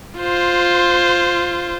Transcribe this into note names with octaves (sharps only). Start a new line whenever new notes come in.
F4 C5